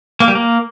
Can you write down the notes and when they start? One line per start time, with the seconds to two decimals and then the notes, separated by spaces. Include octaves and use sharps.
0.20 A#3
0.28 G3
0.35 A#3